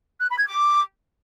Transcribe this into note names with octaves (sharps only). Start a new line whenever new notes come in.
F#6
B5
G#6
D6